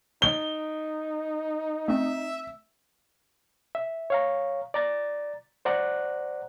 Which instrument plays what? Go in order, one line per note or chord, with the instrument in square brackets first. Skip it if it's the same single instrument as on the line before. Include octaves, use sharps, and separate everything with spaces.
[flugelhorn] D#4 [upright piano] G7
[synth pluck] A3 C4 [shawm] E5
[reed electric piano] E5
C#5 F5 A#5
D5 A#5 A6
C5 D5 F#5 A#5 F#6